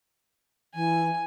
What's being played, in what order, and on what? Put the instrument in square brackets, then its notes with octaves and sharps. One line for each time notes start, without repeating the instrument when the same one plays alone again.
[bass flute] E3 [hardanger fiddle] G#5